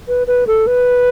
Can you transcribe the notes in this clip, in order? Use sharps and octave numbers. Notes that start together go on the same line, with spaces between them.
B4
B4
A4
B4